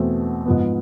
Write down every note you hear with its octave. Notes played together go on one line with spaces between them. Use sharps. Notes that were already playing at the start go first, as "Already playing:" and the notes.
Already playing: E2 B2 A3 C4
G#2 F3 B3